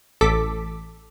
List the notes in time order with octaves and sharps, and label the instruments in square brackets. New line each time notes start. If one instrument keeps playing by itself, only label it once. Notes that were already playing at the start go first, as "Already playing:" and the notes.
[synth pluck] A1 A4 D6 B6